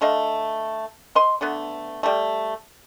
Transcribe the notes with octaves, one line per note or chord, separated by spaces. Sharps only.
D3 A3 D#5 F5
C5 D#5 C6
D3 A3 B3
G3 A3